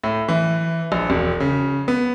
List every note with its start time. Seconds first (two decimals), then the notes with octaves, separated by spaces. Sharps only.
0.04 A2
0.29 E3
0.92 A#1
1.10 E1
1.40 C#3
1.88 B3